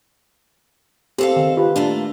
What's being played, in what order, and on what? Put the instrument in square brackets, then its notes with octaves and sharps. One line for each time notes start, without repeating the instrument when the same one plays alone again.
[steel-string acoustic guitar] C4 A4 F5 [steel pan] G4
[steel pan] D#3
F4 G4 B4
[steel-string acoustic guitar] A3 A#3 F4 [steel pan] D4